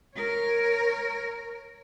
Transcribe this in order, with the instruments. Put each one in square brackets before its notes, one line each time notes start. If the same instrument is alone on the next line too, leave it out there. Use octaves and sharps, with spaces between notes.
[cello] A#4 C#5